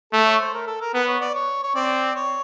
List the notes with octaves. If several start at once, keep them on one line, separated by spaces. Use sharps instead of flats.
A3 A4
C#5
C5
A#4
A4
A#4
B3 B4
C#5
D5
C#5
C#5
C4 D5
C#5